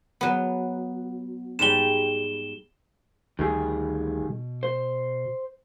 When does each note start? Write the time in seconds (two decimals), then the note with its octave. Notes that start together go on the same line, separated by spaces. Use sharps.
0.21 F#3 B3
1.59 G#2 G3 E7 G7
3.39 D2 D#3 G3 G#4
4.29 B2
4.63 C5